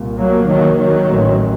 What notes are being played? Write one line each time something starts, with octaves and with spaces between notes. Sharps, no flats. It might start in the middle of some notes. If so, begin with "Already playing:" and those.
Already playing: C2 A#2
F#3 A#3
D#3 F#3
D#3 F#3
A1 A2